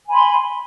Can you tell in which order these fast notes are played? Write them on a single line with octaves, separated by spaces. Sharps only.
G#5 B5 C6